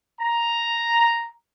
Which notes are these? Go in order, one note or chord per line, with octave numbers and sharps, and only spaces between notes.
A#5